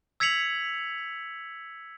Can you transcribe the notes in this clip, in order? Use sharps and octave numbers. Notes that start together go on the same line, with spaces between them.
E6 G#6 B6 C#7 F7 F#7